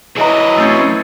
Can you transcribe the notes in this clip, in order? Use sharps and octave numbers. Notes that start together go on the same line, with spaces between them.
E3 F#3 G#4 B4 D#5 A#5
A3 C4 C#4